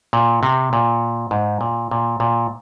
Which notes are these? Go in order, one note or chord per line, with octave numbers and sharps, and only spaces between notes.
A#2
C3
A#2
G#2
A#2
A#2
A#2